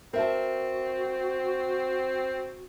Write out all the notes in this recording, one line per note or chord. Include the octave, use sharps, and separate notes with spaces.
C4 F#4 A#4 E5 A5